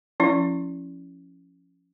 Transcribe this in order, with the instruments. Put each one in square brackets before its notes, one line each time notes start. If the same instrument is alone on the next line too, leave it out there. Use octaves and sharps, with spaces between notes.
[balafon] F3 C#4 E4